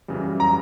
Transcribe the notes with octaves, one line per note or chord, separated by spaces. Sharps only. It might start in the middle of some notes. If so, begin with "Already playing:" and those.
F#2 C#3 E3 G3
A#5